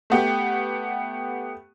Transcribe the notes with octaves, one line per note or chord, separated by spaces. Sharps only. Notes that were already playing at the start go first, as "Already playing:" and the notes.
A3 B3 G4